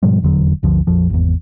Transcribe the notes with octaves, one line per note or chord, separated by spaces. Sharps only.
G#2 B2 F3 G3
F1 E2 D3 F#3
G1 D2 D3 F3
A#1 F2 F3
G#1 E2